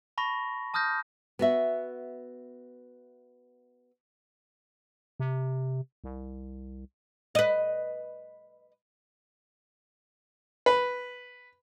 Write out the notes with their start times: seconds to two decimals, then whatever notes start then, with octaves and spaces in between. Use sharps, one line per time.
0.18 A5 B5 C#6 A#6
0.74 A5 D#6 F6 G6 A#6
1.39 B3 F#4 E5
5.20 C3
6.04 C2
7.35 B4 D#5
10.66 B4